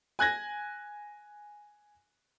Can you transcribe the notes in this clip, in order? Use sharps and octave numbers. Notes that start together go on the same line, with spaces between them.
G#5 F#6 G#6 A#6